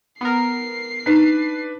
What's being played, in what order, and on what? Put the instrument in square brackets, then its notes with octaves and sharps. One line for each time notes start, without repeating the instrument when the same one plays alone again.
[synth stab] B3 A#4 [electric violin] C7
[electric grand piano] D4 B4 [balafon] D#4